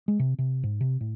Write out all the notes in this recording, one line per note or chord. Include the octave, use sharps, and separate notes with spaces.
G#3
C3
C3
G#2
C3
A2